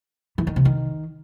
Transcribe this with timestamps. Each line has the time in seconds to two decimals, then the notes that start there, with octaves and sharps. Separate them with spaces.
0.38 E3
0.47 D#3
0.56 C3
0.65 D#3